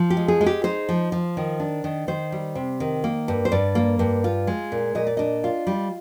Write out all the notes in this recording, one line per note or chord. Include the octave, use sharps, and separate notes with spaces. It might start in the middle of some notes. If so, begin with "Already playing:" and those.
Already playing: F3
G4
G#3
G#4
G#3
G4
D#4 C5
F3
F3
D#3
D4
D#3
D#3 C5
G3
C3
D#3
A#3
G2
C5
G2 D5
A#3
G2
F4
G#3
A#2
A#2 D#5
D5
D4 D#5
F4
G3